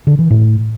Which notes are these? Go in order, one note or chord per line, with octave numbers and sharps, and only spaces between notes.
D3
E3
A2